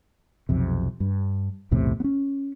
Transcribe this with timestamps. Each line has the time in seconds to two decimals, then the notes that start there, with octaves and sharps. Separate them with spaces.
0.49 B1 F2 C3
1.00 G2
1.71 B1 E2 A2 C3
2.00 B3 C#4